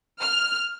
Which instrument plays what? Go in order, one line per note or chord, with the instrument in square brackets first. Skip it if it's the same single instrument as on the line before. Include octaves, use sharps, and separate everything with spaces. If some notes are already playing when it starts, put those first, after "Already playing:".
[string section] F6